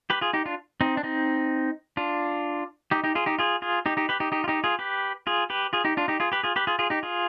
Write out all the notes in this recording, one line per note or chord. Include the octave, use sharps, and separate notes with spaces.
G4 B4
F4 G#4
D#4 G4
D4 F4
C4 D#4
D4
C4 D#4
D4 F4
D#4 G4
D#4 G4
F4 G#4
D#4 G4
F4 G#4
F4 G#4
D#4 G4
D#4 G4
G4 B4
D#4 G4
D#4 G4
F4
D#4 G4
F4 G#4
G4 B4
F4 G#4
G4 B4
F4 G#4
D#4 G4
D4 F4
D#4 G4
F4 G#4
G4 B4
F4 G#4
G4 B4
F4 G#4
F4 G#4
D#4 G4
F4 G#4